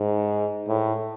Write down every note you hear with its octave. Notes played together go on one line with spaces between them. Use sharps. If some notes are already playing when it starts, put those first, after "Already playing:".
Already playing: G#2
A2